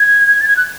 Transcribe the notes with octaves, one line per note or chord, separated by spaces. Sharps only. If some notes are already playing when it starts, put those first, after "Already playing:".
Already playing: G#6
A6
G#6
F#6